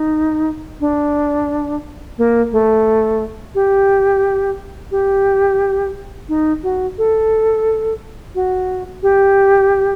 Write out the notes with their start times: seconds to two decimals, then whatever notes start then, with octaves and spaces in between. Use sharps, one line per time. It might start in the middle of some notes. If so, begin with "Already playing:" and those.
Already playing: D#4
0.81 D4
2.18 A#3
2.52 A3
3.55 G4
4.91 G4
6.29 D#4
6.63 F#4
6.98 A4
8.35 F#4
9.03 G4